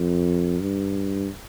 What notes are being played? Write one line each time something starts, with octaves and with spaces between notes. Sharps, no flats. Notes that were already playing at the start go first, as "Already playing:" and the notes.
Already playing: F2
G2